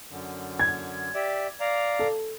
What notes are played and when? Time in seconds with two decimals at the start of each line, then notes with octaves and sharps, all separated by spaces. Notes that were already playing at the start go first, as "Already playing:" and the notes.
0.10 F#2 D3
0.59 G#6
1.15 G4 D5 E5
1.60 D5 F5 A#5
1.99 A4